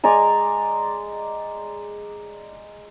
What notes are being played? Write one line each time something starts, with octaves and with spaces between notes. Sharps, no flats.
G#3 D5 G#5 A#5